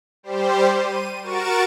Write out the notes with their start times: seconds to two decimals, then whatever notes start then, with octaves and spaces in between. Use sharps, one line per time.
0.23 G3 G4 C5
0.78 D#7
1.23 F#4 A#4 C#6 A6 D7 E7